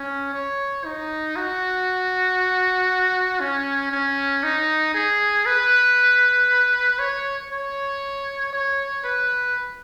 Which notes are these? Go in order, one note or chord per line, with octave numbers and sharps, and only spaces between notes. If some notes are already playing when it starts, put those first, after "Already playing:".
Already playing: C#4
C#5
D#4
F#4
C#4
C#4
D#4
G#4
B4
C#5
C#5
C#5
B4